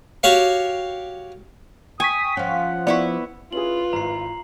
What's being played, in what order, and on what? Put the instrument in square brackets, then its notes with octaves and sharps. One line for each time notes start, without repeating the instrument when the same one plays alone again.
[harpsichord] F#4 G4 C#5 F5
[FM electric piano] G5 C#6 B6 [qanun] G#5 [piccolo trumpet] D#6
[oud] F3 C#4 [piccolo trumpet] F#5
[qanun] B3 E4 B4 [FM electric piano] D5 C#6
[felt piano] C#4 E4 G#4 [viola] F4 [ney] B4 [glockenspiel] F#7
[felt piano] G#1 E4 [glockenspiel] A#5 C7